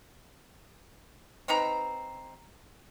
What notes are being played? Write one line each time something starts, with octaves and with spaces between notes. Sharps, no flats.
C4 D#4 B4 A#5